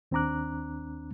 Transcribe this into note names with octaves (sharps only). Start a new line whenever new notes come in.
D#2 C4 D4 A#5 D6 F#6